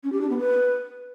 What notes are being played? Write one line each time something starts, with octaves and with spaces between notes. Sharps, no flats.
C#4
G4
D4
B3
B4